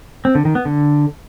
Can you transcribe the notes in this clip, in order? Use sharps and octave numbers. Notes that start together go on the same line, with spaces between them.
C4
D3
D#3
B3
D3